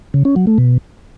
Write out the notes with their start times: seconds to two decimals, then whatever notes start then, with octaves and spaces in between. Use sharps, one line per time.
0.14 C#3
0.25 C#4
0.36 F#3
0.47 A3
0.58 B2